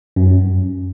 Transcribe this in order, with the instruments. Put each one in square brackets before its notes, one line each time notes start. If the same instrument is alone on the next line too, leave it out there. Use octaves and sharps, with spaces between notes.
[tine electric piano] F#2